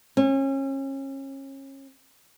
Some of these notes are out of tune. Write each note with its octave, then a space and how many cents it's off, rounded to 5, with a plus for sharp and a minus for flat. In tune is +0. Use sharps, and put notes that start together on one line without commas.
C#4 -30